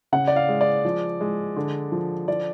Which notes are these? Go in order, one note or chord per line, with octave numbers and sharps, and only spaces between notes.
C#3 F#5
D5
F5
G#3
D5
F3
G#3
D3
F3
F3 D5